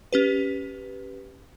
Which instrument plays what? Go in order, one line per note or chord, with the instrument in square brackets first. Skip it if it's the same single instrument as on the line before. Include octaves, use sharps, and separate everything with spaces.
[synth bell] C#4 G4 B4